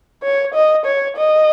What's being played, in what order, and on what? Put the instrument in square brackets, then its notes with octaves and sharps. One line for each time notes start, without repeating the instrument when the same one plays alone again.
[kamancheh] C#5
D#5
C#5
D#5